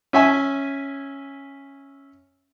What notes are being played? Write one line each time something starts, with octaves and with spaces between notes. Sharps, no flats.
C#4 E5 G#5